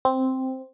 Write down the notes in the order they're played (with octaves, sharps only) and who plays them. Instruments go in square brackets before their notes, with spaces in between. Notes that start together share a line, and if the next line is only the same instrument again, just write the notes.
[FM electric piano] C4